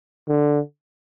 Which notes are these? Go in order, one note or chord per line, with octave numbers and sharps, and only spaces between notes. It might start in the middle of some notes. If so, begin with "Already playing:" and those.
D3